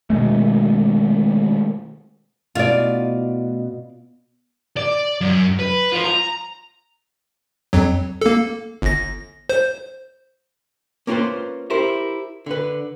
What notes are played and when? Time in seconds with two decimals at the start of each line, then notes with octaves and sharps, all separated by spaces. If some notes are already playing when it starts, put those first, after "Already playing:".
0.10 B2 D#3 G#3 A3
2.55 B2 A3 C#4 E4 F4 D5
4.77 D5
5.21 F#2
5.59 B4
5.92 F4 C5
6.04 A#5
7.73 F2 F#3
8.22 A#3 A4
8.82 G1 A#6
9.49 C5
11.07 A#3 C#4 F4 A4 B4 C5
11.70 E4 G4 A#4 C5
12.46 D3 B4